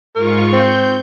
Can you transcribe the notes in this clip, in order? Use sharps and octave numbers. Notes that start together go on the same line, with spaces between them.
G#2 F4 A#4 C#6
C4 G6